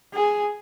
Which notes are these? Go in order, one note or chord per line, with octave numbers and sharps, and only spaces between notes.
G#4